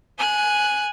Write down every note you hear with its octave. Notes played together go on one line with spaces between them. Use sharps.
G#5 F#6